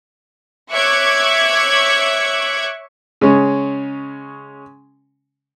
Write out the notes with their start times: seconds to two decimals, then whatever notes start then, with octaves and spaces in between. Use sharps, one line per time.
0.71 C#5 E5 C#6 D6 F#6 G#6
3.21 C#3 G#3 C#4